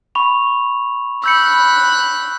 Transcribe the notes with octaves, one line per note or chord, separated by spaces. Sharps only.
B5 C#6 F7
B5 E6 F#6 G6 C#7